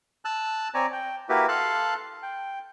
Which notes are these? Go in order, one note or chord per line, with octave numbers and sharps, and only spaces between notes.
A5 E6 F#6
C4 C#5 D5 G#5 A#5
G5
A#3 E4 F#4 G4 B4
A4 F5 A5 C6 F#6
G5